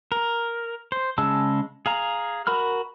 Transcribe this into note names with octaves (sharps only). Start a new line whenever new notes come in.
A#4
C5
C#3 G#3 A5 E6
G#4 F5 A#5
F#4 A#4 B5 F6